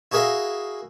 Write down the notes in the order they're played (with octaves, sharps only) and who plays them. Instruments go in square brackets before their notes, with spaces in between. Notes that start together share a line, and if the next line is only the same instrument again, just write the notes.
[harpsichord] E4 F#4 G#4 A#4 E5 F5